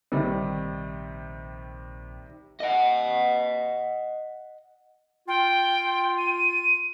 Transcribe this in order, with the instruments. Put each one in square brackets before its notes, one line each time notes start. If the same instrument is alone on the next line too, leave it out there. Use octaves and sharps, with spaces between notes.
[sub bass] A#1 [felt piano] C3 D#3 G3
[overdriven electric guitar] D#5 F#5
[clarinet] F4 [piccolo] G5
[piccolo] D#7